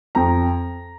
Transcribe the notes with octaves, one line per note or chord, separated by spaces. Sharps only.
F2 A#5